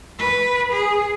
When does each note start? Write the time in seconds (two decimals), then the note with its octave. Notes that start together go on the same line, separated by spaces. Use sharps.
0.19 B4
0.72 G#4